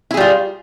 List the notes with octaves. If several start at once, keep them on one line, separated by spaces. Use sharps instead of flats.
G3 E4 F4 G#4